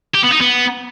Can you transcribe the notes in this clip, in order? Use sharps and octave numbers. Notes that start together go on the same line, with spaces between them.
G4
B3
D#4
B3